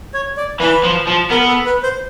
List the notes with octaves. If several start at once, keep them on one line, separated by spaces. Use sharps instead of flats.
C#5
D5
E3 B4
F3
F3
B3 A#4
A4
B4
C5